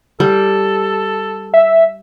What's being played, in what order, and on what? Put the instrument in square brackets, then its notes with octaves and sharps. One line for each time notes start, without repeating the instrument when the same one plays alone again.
[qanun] G3 [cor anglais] A4
[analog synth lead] E5